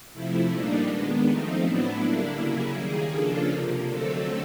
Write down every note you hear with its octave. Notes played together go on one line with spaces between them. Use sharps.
C3 F3 A3 E4
A#2 G3 A#3 D4 D#4
D#3 G#3 B3 D4
F3 A3 C4 D#4
A2 F#3 B3 D4 E4
D3 G3 A#3 D4 E4
C#3 F#3 A#3 C#4 E4
D#3 G3 A#3 G#4
C#3 F3 A#3 D4 A4
C3 F3 A#3
D3 F#3 A3 C4 A4